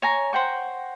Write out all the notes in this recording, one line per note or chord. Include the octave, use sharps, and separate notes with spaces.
C#5 G#5 A#5
C5 F#5 G5 C#6